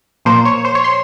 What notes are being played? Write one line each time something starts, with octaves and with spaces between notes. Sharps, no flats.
A#2 F3 A#3 C5
C#5
C5
C#5
C6